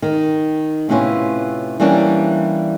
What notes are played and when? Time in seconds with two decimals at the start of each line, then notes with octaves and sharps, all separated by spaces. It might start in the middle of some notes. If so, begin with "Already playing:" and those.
0.02 D#3
0.89 A2 C3 B3 C#4 E4 F4
1.80 E3 G3 A#3 C#4 D4